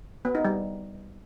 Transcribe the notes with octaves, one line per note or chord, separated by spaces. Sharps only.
B3
D#4
G3